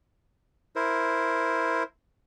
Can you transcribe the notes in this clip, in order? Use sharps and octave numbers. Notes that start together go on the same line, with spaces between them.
E4 A#4 C5